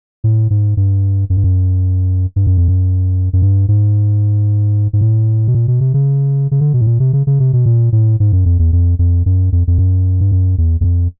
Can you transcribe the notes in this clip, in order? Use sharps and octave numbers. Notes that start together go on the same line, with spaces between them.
A2
G#2
G2
F#2
G2
F#2
G2
F#2
F2
F#2
F#2
G2
G#2
G#2
A2
B2
A#2
B2
C3
C#3
C#3
D3
B2
A2
A#2
C3
C#3
C#3
C3
B2
A#2
A2
G#2
F#2
F2
E2
F2
F2
F#2
F2
F2
F#2
G2
F#2
E2
E2
F2